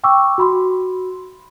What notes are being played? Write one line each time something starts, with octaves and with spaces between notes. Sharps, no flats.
G5 C#6 D6 E6
F#4 B5 C6